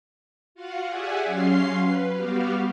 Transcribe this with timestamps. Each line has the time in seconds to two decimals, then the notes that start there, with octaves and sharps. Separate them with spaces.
0.55 F4 F#4 F5 F#5
0.87 G4 G#4 D5 E5 F#5 G#5
1.25 F#3 C#4 F5 C6 C7
1.82 B4
2.14 G3 B3 F#4 G4 F5